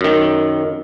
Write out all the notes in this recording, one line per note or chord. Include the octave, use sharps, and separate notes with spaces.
F#2 D#3